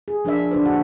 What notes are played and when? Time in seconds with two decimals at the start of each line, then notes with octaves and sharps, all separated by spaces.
0.08 G#4
0.25 F3 D4 A#4 D5 E5
0.51 D3 D4 B4 C5
0.65 A#2 F#4 F#5